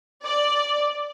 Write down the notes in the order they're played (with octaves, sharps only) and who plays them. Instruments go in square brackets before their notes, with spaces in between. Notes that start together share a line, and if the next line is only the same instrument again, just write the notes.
[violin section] D5